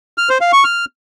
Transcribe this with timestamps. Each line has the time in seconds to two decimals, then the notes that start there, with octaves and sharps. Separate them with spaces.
0.18 F6
0.29 C5
0.41 F5
0.53 C#6
0.64 F6